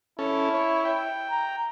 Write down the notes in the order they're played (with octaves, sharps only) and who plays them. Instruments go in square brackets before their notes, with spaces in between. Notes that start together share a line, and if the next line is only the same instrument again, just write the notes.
[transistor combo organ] C#4 A4 [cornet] E4
[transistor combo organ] C#5
G5
[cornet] A#5